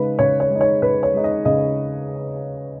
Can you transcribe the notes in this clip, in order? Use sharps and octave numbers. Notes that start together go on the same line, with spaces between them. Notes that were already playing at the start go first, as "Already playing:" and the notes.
Already playing: C#3 G#3 D#4 B4
C#3 C#5
C#5
G#3
D#4
C#5
C#3 B4
C#5
G#3 D#4
D#5
C#3 D#5